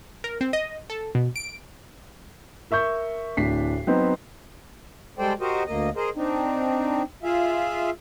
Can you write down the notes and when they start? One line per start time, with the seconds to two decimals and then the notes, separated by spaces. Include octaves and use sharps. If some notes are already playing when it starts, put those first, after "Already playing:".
0.24 A#4
0.41 C4
0.53 D#5
0.90 A4
1.15 B2
1.36 D7
2.71 A#4 E5 C#6 G6
3.37 D1 A2 D4 B6 C7
3.87 F#3 B3 C4 D#4 C5
5.18 G3 G#3 A4 C5 D5 G5
5.40 F#4 G4 A#4 C5 D#5
5.66 D2 A#3 D#5
5.96 G#4 A#4 C5 D#5
6.16 C4 D4 D#4
7.23 F4 G#4 E5 F5